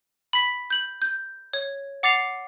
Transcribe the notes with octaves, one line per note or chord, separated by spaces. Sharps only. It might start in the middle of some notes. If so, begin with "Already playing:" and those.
B5 B6
G6 F#7
G6
C#5
F#5 D6 A6 C7 F7